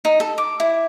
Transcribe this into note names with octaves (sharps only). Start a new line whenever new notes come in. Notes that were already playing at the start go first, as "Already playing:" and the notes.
D#4
A4
D6
E4